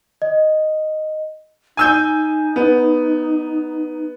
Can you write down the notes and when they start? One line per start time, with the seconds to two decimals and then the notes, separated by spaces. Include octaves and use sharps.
0.22 D#5
1.77 D#4 G#5 E6 G6
2.56 B3